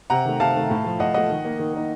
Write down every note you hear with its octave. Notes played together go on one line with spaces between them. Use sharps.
C3 F#5 A#5
D#3 A3
C3 F5 A5
D#3 A3
A2
F3 A3
A2 D#5 F#5
F3 A3 D#5 F#5
D#3
A#3 D#4
D#3
A#3 D#4